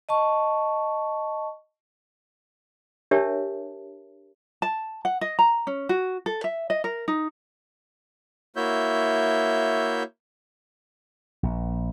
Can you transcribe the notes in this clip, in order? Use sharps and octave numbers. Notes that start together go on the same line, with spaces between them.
D#5 A5 C#6
D4 G4 A#4 C#5 E5 A5
A5
F#5
D#5
A#5
C#4
F#4
A4
E5
D#5
A#4
D#4
A#3 E4 F#4 C#5 E5 G6
A#1